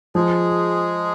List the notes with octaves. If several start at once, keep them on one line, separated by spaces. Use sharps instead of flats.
F3 G#3 G#4